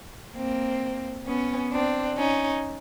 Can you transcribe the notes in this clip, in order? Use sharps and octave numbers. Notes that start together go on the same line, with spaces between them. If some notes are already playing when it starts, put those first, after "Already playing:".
A#3 C4
B3 C#4
C4 D4
C#4 D#4